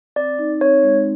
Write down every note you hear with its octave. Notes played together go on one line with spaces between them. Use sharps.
C4 D5
D#4
C4 C#5
G#3